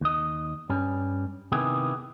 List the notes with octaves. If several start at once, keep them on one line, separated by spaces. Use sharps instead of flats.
D#2 D#5
G2 G3 C#4
C3 D#3 B3 E4 G4 G#4